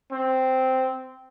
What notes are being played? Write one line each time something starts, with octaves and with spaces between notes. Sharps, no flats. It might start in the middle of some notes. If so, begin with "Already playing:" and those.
C4